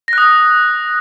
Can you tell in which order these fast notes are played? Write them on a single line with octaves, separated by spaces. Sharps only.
A#6 F#6 D#6